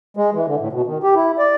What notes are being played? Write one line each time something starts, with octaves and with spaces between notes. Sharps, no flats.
G#3
E3
D3
A2
B2
D#3
G4
E4
D5